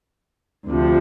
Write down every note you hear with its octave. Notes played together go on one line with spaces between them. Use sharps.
D2 C3 F3